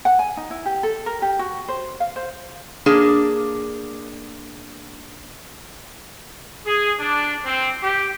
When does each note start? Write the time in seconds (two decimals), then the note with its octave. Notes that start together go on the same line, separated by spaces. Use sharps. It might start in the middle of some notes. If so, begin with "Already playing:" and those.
0.05 F#5
0.19 G#5
0.37 D#4
0.51 E4
0.66 G4
0.83 A4
1.06 A#4
1.22 G4
1.39 F#4
1.68 C5
2.00 F5
2.16 C5
2.86 A#3 D4 G#4
6.65 G#4
6.99 D4
7.45 C4
7.83 G4